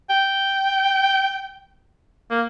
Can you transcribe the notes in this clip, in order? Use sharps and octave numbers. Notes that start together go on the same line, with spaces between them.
G5
A#3